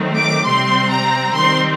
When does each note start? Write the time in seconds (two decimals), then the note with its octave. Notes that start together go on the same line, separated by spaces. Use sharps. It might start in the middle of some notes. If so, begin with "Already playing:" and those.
Already playing: D#3 F#3 A3 C4
0.17 D6
0.46 C3 G3 C4 C6
0.89 A#5
1.34 D#3 G3 C4 C6